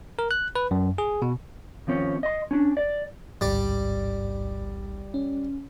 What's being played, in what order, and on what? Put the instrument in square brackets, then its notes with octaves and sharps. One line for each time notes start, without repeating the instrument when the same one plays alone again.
[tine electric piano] A#4
F#6
B4
F#2
G#4
B2
[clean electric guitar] D#2 F3 C4 C#4
D#5 C6
C#4 D4
D5
[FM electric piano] A1 D2 G#2 [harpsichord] G3 D5
[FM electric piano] C#4